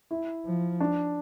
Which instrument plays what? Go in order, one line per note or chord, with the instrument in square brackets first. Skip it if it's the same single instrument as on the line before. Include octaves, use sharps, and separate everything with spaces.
[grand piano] E4
[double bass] F3
[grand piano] D4